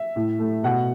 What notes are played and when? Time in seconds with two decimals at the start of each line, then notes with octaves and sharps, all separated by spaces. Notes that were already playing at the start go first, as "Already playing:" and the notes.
Already playing: E5
0.16 A2
0.39 A3
0.63 B2 F#5